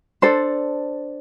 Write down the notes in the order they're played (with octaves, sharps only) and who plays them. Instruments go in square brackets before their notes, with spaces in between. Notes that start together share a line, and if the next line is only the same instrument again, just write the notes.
[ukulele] D4 A4 C5